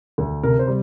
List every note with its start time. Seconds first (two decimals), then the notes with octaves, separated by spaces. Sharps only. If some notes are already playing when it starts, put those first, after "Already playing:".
0.18 D2
0.43 C3 A#4
0.59 C5
0.67 G3